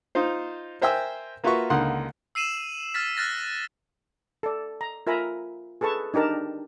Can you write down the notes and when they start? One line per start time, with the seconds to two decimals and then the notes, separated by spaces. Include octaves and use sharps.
0.15 D#4 F4 C5
0.81 A#4 C5 E5 G5 G#5 E6
1.44 A#3 F4 F#4 B4 E5 C#6
1.70 C#2 D3 A#3 D#4 F#5 C6
2.35 E6 C7 D#7 E7 F#7
2.94 F6 A6 B6
3.17 F6 F#6 A6 A#6
4.43 A4 D5
4.81 A#5
5.07 F4 A#4 E5 G#5 A#5 B5
5.81 G#4 A4 B4 A5 C#6
6.14 D4 D#4 G4 A#4 A5